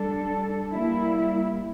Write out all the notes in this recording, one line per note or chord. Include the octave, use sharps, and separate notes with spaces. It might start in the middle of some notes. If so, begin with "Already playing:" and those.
Already playing: G3 D4 A4
G3 A#3 E4